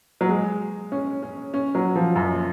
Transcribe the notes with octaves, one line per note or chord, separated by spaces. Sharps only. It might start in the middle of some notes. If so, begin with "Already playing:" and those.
F#3
G#3
C#4
C#4
C#4
F#3
F3
F#2